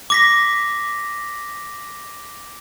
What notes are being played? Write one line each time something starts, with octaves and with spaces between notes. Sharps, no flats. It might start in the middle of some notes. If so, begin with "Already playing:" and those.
D6 A#6 B6